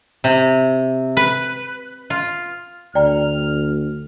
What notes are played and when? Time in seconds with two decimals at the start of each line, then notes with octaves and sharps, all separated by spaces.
0.24 C3
1.17 B4
2.10 F4
2.95 D2 D5 G5 A#5 F6